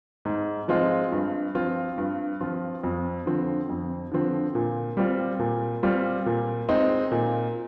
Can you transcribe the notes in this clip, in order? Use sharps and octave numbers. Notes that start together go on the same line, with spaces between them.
G#2
F3 G#3 C4 F4
G2
F3 C4 F4
G2
F3 C4 F4
F2
D3 F3 C4
F2
D3 F3 C4
A#2
G3 C4 F4
A#2
G3 C4 F4
A#2
G#3 C4 D#4
A#2